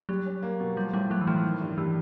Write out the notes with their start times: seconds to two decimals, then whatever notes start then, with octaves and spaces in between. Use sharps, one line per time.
0.09 F#3 G3
0.26 C#4
0.43 A#3
0.60 B2
0.76 F3 G3
0.93 A2 G3
1.10 F#3 A3
1.21 E3
1.27 A2 F3
1.44 D#3
1.61 G2
1.78 E3 G3